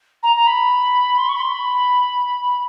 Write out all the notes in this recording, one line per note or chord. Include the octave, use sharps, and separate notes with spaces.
A#5
A#5
B5
C6
C#6
B5
C6
B5